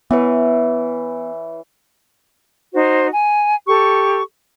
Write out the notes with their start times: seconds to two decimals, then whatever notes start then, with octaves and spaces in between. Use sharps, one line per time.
0.11 E3 B3 B4 C#5 E5
2.73 D#4 F#4 C5
3.12 G#5
3.67 G4 A4 C#6